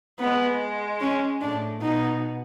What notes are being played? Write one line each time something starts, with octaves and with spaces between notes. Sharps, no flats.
G#3 B3
C#4
A2 A3 D4
B2 B3 D#4